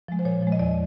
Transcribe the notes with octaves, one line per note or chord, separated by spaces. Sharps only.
F3 G#3
C5
A#2 C#5
F3 G#3
D#5
E2 D5